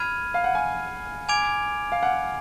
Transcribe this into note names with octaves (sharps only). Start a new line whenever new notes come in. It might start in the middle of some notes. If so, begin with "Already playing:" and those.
Already playing: B5 F6 G#6 D#7
F5
F#5
G#5
G#5 D6 G#6 D7 F7
F5
F#5